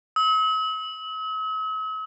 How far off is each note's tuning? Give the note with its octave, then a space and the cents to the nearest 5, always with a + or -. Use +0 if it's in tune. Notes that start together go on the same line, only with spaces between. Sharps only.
E6 -45